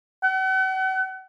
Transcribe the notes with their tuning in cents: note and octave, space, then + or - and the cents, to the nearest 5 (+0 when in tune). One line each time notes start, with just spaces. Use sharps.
F#5 +40